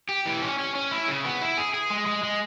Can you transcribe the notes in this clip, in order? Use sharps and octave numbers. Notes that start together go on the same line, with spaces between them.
G4
E3
C#4
C#4
C#4
E4
C#3
B3
E4
G#4
G#4
G#3
G#3
G#3